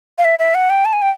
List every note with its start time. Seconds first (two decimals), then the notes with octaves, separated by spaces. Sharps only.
0.18 F5
0.25 E5
0.39 E5
0.55 F#5
0.70 G5
0.85 A5
0.93 G#5
1.02 G5